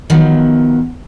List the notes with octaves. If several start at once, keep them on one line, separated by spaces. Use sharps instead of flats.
D#3 F3 F#3 B3